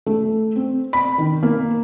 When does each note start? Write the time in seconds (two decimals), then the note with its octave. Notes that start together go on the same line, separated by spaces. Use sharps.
0.06 A3
0.56 C4
0.93 B5
1.18 D#3
1.43 A#3